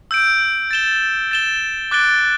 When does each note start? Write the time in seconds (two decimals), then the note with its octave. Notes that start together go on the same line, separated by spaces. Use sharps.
0.11 E6 G6 D7
0.71 A6 E7 G7
1.31 A6 E7 G7
1.91 D6 F#6 A6 D7 G7